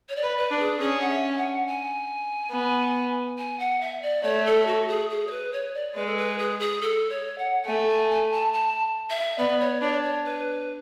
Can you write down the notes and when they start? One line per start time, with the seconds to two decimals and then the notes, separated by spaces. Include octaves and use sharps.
0.09 C#5
0.16 D5
0.23 B4
0.37 B4
0.51 D4
0.59 G#4
0.80 C#4 G#4
1.00 F#5
1.09 E5
1.31 G#5
1.37 F#5
1.66 G#5
2.51 B3
3.38 G#5
3.59 F#5
3.80 E5
4.02 D5
4.23 A3 C#5
4.45 A4
4.67 F#4
4.88 G#4
5.09 G#4
5.27 C#5
5.30 B4
5.52 C#5
5.74 D5
5.94 G#3 B4
6.06 A4
6.16 B4
6.38 G#4
6.59 G#4
6.81 A4
7.09 C#5
7.38 F#5
7.62 F#5
7.66 A3 G#5
7.88 G#5
8.10 G#5
8.31 A5
8.53 A5
9.10 E5
9.38 B3 D5
9.60 C#5
9.82 D4 C#5
10.03 C#5
10.24 B4